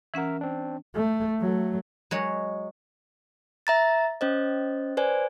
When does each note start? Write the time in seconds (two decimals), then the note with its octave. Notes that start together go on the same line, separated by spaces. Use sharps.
0.14 E3 C#4 A#4 E5 F#5
0.41 C4 D4
0.95 A3
1.40 F#3 A3
2.11 F#3 G#3 C#5
3.67 E5 A#5 A6
4.21 C#4 C5 D#5
4.97 B4 C5 D5 G#5